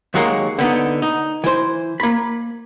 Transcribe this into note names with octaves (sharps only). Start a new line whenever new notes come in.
D#2 D#3 F#3 G#3 A#3
D3 B3 D#4
D#4
E3 C5
A#3 B5